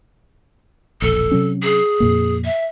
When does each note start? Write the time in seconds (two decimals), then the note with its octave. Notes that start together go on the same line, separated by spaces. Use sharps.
1.02 E1 A#1 A4
1.31 C3 F#3 C#4
1.63 G#4
2.00 F2 A#2 A#3
2.45 E5